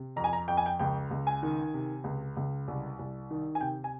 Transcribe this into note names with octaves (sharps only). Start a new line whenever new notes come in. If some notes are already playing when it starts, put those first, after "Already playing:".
Already playing: C3
F2 A#5
G#5
A#5
F2 G5
G#5
G5
C#2 G5
C#2
G#5
D#3
C3
C#2
C#2
C2
C2
D#3
G#5
C3 G5
G#5